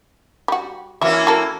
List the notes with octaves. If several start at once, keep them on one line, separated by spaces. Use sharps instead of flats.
G3 F#4
E3 A#3 C#4 F#4 E5
F#4 A4 A#4